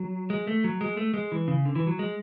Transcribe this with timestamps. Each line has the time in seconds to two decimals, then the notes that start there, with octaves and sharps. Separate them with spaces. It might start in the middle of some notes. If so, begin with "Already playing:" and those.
Already playing: F#3
0.30 G#3
0.47 A3
0.64 F#3
0.81 G#3
0.97 A3
1.14 G#3
1.32 E3
1.48 C#3
1.65 D3
1.75 E3
1.87 F#3
1.99 G#3